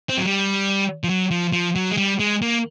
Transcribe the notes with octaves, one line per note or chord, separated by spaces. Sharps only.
C4
F#3
G3
F3
F#3
F3
F3
F#3
G#3
G3
G#3
A#3